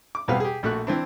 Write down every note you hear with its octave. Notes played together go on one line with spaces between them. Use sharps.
D6
E2 B2 G3 C4 B4 F5
G4 G#4
A#1 A3 F#4 F#6
E3 C4 D4